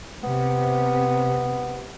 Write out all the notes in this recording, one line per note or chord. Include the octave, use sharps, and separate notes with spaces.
C3 B3